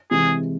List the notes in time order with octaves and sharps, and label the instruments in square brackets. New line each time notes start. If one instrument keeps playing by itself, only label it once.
[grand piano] C3 E3 G#3 [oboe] G#4